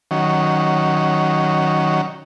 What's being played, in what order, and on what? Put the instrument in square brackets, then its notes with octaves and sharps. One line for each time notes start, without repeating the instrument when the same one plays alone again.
[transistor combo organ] D#3 F#3 C#4